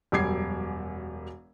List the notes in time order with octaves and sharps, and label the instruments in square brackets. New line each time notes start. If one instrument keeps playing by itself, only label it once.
[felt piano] E1 F#2 G3 D6 G#6 C7